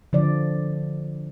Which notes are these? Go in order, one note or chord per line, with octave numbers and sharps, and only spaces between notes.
D3 F3 D5